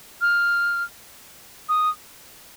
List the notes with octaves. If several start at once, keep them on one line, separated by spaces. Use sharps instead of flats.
F6
D#6